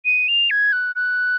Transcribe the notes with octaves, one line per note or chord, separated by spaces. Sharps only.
D#7
F7
G#6
F#6
F#6